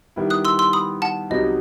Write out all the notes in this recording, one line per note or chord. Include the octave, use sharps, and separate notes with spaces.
D#3 G3 B3 E4
D#6 F#6
C6 E6
C6 E6
B5 D#6
F#5 A5
C2 C3 F#3 B3 D#4 D#5